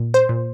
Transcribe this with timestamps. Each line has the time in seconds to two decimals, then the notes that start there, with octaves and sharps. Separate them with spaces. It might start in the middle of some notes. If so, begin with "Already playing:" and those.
Already playing: A#2
0.14 C5
0.29 A#2